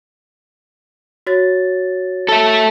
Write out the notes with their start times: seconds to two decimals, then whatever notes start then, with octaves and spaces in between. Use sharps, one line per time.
1.27 F#4 C#5 A6
2.28 A4 E5